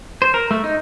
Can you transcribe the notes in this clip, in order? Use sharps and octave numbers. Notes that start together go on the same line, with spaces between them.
C5
A#4
A3
D#4